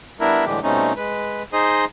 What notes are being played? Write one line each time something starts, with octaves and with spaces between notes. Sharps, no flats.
G3 B3 D4 E4 A#4 E5
A2 D3 E3 G3 G#3 G4
B2 G3 A3 C4 C#4 D#4
G#3 B4
D#4 G#4 C5 D#5 C6 D#6